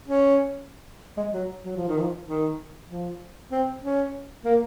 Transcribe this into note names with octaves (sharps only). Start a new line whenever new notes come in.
C#4
G#3
F#3
F#3
F3
D#3
F3
D#3
F3
C4
C#4
A#3